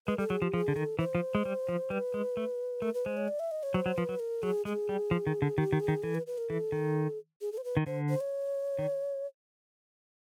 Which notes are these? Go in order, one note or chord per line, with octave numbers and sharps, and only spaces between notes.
G#3 B4
G3 A4
F#3 G#4
F3 G4
F3 G#4
D3
D#3 A4
E3 C5
F3
G#3
G3
F3
G3 B4
G#3
A3
A3 A#4
B4
G#3 C5
C#5
D5
E5
D#5
C#5
F#3 C5
F#3
F3 B4
F#3
A#4
F#3 G#4
G#3 G#4
G3
F3
D#3
D3
D#3 G4
D#3
G#4
D#3
E3 A4
B4
B4
A#4
E3 A4
D#3
G#4
A4
C5
B4
D#3
D3 C5
C5
C#5
D#3